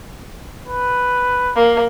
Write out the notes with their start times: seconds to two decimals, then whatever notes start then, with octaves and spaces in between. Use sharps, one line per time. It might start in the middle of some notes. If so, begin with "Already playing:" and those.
0.67 B4
1.56 A#3